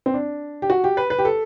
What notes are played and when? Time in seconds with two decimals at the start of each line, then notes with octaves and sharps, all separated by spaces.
0.06 C4
0.14 D4
0.62 G4
0.70 F#4
0.84 G4
0.97 B4
1.10 B4
1.19 G4
1.25 A4